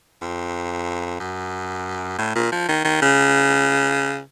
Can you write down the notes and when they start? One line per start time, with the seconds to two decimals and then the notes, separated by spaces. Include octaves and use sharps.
0.22 F2
1.20 F#2
2.19 A2
2.36 A#2
2.52 F3
2.69 D#3
2.85 D#3
3.02 C#3